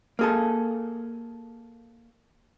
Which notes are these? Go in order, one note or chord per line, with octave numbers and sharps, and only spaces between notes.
A#3 G#4 A4